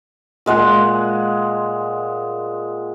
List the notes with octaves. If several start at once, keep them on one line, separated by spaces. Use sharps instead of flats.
A#2 G#3 F#5